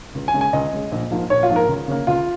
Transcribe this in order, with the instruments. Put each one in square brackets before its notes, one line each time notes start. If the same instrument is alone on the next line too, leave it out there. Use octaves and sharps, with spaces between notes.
[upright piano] C#2
G#5
C#3 G#3
G#5
C#2 D#5
C#3 G#3
A#1
G#2 F3 A#3
A#1 C#5
F4
G#2 F3 A#3
A#4
C#2
C#3 A#3
C#2 F4